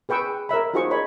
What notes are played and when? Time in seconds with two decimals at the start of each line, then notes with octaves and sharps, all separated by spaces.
0.09 G#4 B4 G5 C#6 E6
0.49 A#4 C#5 E5 B5
0.74 D#4 F4 F#4 G#4 C5 C#6
0.90 A#4 C#5 D#5 B5